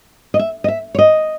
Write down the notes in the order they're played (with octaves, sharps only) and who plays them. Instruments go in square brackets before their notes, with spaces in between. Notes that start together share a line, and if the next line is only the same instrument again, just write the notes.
[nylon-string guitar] D#5
E5
D#5
E5
C#5
D#5